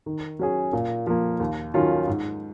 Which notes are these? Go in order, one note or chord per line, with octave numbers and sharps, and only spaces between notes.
D#3
F#3 C#4 G#4
A#2
F3 A#3
D#2
D#3 F#3 C#4 F4
G#2